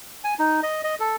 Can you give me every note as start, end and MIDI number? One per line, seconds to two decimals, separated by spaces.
0.24 0.34 80
0.39 0.61 63
0.63 0.81 75
0.84 0.95 75
1.00 1.16 69